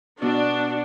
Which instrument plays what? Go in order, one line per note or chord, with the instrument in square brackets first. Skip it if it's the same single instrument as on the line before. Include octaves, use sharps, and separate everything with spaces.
[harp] B2 B3 [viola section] D4 [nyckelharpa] F#4